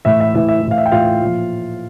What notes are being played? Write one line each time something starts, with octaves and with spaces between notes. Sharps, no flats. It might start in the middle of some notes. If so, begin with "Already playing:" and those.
A2 E3 E5
E5
A2 E3 E5
E5
E3
A2 F5
E5
G5
A2 E3 F4 F5
A#2 F3